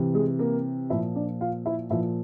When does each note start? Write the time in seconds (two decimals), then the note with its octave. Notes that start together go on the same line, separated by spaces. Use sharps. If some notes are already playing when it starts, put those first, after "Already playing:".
Already playing: C3 E3
0.14 G#3 G#4
0.39 A#3 A#4
0.90 A#2 F3 E4 E5
1.15 D4 D5
1.41 F4 F5
1.66 E4 E5
1.90 A#2 F3 E4 E5